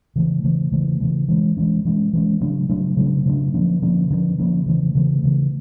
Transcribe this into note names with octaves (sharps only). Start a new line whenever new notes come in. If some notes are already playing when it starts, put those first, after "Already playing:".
C#3 E3 A3
C#3 E3 A3
C#3 E3 A3
C#3 E3 A3
E3 G#3 C#4
E3 G#3 C#4
E3 G#3 C#4
E3 G#3 C#4
C#3 F#3 A3 D4
C#3 F#3 A3 D4
C#3 F#3 A3 D4
C#3 F#3 A3 D4
D3 F3 A#3 C#4
D3 F3 A#3 C#4
D3 F3 A#3 C#4
D3 F3 A#3 C#4
C#3 E3 A3
C#3 E3 A3
C#3 E3 A3